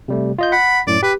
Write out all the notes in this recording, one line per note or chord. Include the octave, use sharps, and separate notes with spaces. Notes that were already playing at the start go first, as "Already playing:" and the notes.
C3 G3 A3
F4 D#5 G6
F#5 B5
F#2 A2 D5
G4 B4